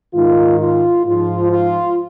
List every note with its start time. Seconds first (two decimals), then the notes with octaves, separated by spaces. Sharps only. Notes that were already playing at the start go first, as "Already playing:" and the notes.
0.14 G#2 D#3 F4
0.59 F4
1.04 G#2 F3 F4
1.51 F4